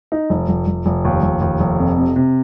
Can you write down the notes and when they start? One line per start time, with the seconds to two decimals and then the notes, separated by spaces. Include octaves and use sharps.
0.12 D#4
0.30 F1
0.49 F1
0.67 F1
0.86 F1
1.05 D#2
1.23 F1
1.41 D#2
1.60 F1
1.79 F2
1.97 C3
2.16 C3